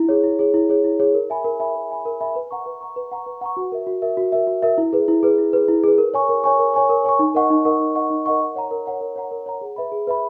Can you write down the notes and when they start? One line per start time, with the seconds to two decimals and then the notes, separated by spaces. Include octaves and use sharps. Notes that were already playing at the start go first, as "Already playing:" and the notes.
Already playing: E4
0.09 G#4 C#5
0.24 E4
0.39 G#4 C#5
0.54 E4
0.69 G#4 C#5
0.84 E4
1.00 G#4 C#5
1.14 A#4
1.30 E5 G#5 B5
1.44 A#4
1.60 E5 G#5 B5
1.75 A#4
1.90 E5 G#5 B5
2.05 A#4
2.21 E5 G#5 B5
2.36 B4
2.51 F#5 A#5 C#6
2.66 B4
2.81 F#5 A#5 C#6
2.96 B4
3.12 F#5 A#5 C#6
3.26 B4
3.41 F#5 A#5 C#6
3.57 F#4
3.72 A#4 E5
3.87 F#4
4.02 A#4 E5
4.17 F#4
4.32 A#4 E5
4.47 F#4
4.63 A#4 E5
4.78 E4
4.93 G#4 B4
5.08 E4
5.23 G#4 B4
5.38 E4
5.53 G#4 B4
5.68 E4
5.84 G#4 B4
5.98 A#4
6.14 C#5 G#5 C#6
6.29 A#4
6.44 C#5 G#5 C#6
6.59 A#4
6.74 C#5 G#5 C#6
6.89 A#4
7.04 C#5 G#5 C#6
7.19 D#4
7.34 A#4 D#5 F#5 C#6
7.50 D#4
7.65 A#4 D#5 F#5 C#6
7.80 D#4
7.95 A#4 D#5 F#5 C#6
8.10 D#4
8.26 A#4 D#5 F#5 C#6
8.40 A#4
8.56 C#5 F#5 A#5
8.71 A#4
8.86 C#5 F#5 A#5
9.01 A#4
9.16 C#5 F#5 A#5
9.31 A#4
9.46 C#5 F#5 A#5
9.61 G#4
9.76 B4 E5 B5
9.92 G#4
10.07 B4 E5 B5